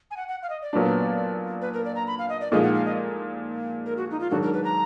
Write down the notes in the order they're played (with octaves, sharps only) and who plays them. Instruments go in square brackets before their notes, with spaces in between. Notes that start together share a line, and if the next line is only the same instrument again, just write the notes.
[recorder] G#5
F#5
F#5
F5
D#5
D5
[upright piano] A#2 F#3 B3 D4
[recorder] B4
A#4
D5
A#5
B5
F5
D#5
D5
[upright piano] A#2 F3 G#3 D#4 [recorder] D#5
[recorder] F#5
F5
D#5
A#4
F#4
D#4
F4
[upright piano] G#2 D#3 F#3 D4 [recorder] F#4
[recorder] A#4
B4
A#5